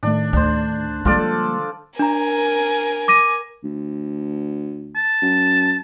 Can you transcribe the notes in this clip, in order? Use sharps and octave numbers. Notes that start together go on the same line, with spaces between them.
A2 D#3 A3 D4
D2 D4 C5
D3 F3 G3 G#3 A#3 F4 A4 D5
D4 A#4 G#5 A#5
D6 A#6 D#7
D2
A5
F#2